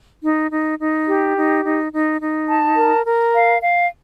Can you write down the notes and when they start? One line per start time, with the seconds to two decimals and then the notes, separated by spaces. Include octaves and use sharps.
0.23 D#4
0.51 D#4
0.79 D#4
1.08 G4
1.36 D#4
1.64 D#4
1.92 D#4
2.21 D#4
2.49 A5
2.77 A#4
3.06 A#4
3.34 F5
3.62 F5